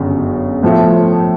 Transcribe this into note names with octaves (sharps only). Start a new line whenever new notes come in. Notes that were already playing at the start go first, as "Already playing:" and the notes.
Already playing: G1 F#2 C#3
A2 F3 A3